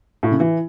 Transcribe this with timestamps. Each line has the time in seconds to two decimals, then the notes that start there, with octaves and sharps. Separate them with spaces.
0.23 A2
0.31 C#3
0.40 E3